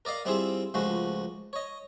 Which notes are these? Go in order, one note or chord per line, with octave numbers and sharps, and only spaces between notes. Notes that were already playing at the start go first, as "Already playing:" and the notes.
A#4 D5 D#5 F5
G3 C4 E4 F4 G#4 E5
C#2 F3 G#3 A3 F#4
C#5 D#5